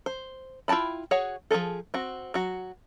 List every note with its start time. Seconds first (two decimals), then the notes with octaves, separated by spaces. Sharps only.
0.06 C5
0.68 E4 F4 G5 A5 B5
1.11 F#4 G#4 C#5 F#5
1.51 F3 A#3 G#4 A4
1.94 C4 F#4
2.34 F#3 F#4